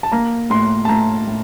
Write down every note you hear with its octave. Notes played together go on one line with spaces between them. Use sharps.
A5
A#3 A#5
A2 C6
A5
A2 A#5
A2